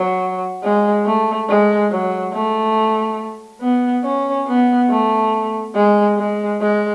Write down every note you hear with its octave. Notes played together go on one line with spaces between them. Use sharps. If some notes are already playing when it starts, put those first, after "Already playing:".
Already playing: F#3
G#3
A3
G#3
F#3
A3
B3
C#4
B3
A3
G#3
G#3
G#3